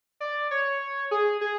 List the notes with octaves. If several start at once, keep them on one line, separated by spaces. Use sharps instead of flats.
D5
C#5
G#4
G#4